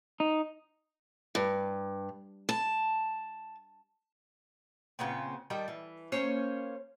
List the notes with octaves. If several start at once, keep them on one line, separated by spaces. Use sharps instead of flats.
D#4
G2
A5
A#2 C#3 B3 C4
D#3 G3 A4 G5
E3
A#3 C#4 C5 C#5